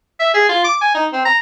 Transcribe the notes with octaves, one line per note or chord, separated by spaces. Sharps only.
E5
G#4
F4
D6
G#5
D#4
C4
A#5